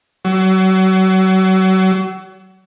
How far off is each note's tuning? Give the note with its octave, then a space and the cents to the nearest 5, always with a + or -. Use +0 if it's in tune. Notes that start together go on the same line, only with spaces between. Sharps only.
F#3 +35